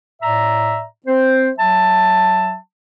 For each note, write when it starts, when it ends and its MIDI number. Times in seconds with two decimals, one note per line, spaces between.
0.22 0.84 45
0.22 0.84 74
0.22 0.84 76
0.22 0.84 82
1.07 1.49 60
1.07 1.49 72
1.58 2.55 54
1.58 2.55 76
1.58 2.55 81